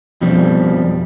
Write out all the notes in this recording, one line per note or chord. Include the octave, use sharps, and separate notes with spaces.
F2 B2 F3 G3